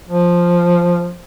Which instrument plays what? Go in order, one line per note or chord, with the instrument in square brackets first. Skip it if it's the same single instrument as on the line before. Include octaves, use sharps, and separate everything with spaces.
[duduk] F3